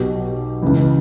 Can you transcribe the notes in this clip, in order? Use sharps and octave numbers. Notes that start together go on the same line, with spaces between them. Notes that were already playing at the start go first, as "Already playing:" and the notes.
Already playing: B1 B2 G4
C#2 C#3 E3